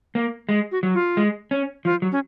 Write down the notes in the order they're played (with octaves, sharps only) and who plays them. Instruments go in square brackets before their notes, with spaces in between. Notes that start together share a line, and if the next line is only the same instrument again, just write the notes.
[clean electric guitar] A#3
G#3
[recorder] F#4
[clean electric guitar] F#3
[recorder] F4
[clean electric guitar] G#3
C#4
[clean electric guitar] F3 [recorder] F4
[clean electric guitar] F#3
[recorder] C#4